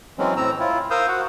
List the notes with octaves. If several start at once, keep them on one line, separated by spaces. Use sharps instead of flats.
E3 F#3 G#3 C4 C#4
A2 C4 A#5 E6
E4 F4
A#4 C5 F5 D#6 E6 G6
F#4 F#5